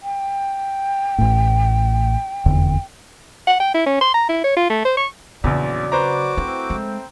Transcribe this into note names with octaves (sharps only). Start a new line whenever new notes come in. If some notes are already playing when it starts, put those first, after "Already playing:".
G5
A1 A2
F1 E2 D3
F#5
G5
E4
C#4
C6
A#5
E4
C#5
F4
A3
C5
C#6
A#1 E2 C#3 F#3 D5
F#4 B4 C5 A#5 D6
A3 C4 E4
G#3